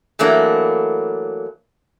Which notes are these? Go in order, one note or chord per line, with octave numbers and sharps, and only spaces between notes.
E3 F#3 A3 A#3 D4